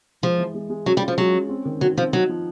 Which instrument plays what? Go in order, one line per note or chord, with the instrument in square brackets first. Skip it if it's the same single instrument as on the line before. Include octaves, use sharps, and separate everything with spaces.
[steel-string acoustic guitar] F3 [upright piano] G#3
[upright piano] E3
G#3
G#3
[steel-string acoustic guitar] F#3 [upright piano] C#4
[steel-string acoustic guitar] G3
[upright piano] F4
[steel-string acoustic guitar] F3
[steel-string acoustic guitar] F#3 [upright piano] G#3
[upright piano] C#4
C4
D#3
[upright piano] D#3 [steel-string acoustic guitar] F#3
[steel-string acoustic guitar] F3 [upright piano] C4
[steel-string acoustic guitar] F#3 [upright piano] D#4
[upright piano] F3